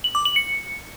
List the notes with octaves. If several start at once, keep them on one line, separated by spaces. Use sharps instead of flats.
F#7
D6
F#7
C#7